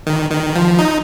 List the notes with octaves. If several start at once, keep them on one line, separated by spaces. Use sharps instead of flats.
D#3
D#3
F3
D#4